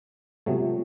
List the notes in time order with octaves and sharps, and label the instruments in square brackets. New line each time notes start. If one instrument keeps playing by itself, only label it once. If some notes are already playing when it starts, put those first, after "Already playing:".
[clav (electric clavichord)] C3 F#3 A3 [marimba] G#3 B3 F4